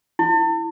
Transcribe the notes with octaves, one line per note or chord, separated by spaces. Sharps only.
E4